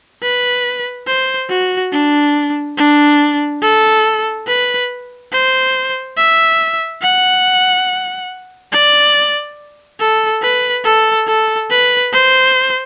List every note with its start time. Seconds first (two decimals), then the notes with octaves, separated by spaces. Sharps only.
0.23 B4
1.07 C5
1.50 F#4
1.93 D4
2.78 D4
3.62 A4
4.48 B4
5.33 C5
6.17 E5
7.02 F#5
8.73 D5
10.00 A4
10.42 B4
10.85 A4
11.28 A4
11.70 B4
12.13 C5